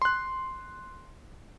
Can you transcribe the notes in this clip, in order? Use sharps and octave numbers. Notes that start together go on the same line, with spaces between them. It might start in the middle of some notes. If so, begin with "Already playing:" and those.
C6 F#6